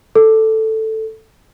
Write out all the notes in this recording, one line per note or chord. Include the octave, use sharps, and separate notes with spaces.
A4